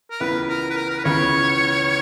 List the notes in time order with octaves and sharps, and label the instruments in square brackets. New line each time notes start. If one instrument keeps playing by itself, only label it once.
[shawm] A#4
[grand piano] C#2 C#3 E3 B3 [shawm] B4
[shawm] A#4
B4
A#4
A#4
B4
[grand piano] C#2 C#3 E3 B3 [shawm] C#5